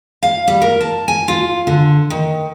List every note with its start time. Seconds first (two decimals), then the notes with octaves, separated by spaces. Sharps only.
0.23 F5
0.48 G3
0.62 A#4
0.81 A5
1.08 G#5
1.28 F4
1.67 D3
2.10 D#3